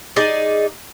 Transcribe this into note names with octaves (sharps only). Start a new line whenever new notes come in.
D#4 G#4 D5